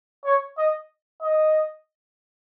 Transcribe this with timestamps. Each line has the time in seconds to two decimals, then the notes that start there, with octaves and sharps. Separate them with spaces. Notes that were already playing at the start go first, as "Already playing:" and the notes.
0.25 C#5
0.58 D#5
1.22 D#5